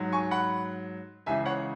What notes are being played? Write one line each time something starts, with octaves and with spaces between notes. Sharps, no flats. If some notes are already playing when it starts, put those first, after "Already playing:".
Already playing: G#2 F#3
G#5 C#6
F#5 B5
C#2 C#3 E3 E5 G#5
C#5 F#5